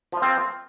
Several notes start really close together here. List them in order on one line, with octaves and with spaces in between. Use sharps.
F3 F4 C4